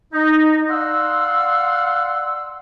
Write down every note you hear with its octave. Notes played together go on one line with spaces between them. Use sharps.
D#4
D5 F5 F#5 C6 E6